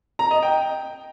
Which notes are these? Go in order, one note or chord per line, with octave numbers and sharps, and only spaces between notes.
A#5
D#5
G5